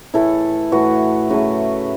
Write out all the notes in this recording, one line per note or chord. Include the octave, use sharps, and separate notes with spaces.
A2 E3 A3 E4 A4
A2 E3 A3 F#4 B4
C#3 F#3 A3 F#4 B4